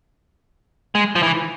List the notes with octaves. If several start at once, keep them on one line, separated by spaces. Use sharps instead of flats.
G#3
F3
E3